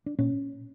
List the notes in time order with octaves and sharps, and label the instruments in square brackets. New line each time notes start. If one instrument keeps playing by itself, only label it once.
[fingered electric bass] D4
A#2 C#4